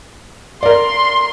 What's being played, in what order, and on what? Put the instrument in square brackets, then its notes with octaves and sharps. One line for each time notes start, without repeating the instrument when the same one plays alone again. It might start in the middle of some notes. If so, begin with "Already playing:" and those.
[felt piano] A#4 D5 [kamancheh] C6